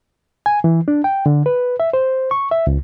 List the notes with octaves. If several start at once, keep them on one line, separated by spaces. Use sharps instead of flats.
G#5
E3
D4
G5
D3
B4
E5
C5
C#6
E5
C#2